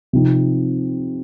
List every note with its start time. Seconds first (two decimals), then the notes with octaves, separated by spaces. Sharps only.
0.13 C3 F3 C4 D#4